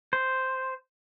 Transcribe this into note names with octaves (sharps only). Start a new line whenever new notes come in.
C5